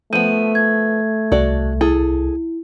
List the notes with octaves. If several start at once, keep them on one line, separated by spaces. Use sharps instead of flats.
F3 A3 B3 D#7
G#6
C2 F#4 A4 D5
E4 G#4 A4